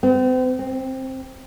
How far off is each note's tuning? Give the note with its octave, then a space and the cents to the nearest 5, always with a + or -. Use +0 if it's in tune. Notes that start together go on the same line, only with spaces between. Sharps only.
C4 -40
C4 +10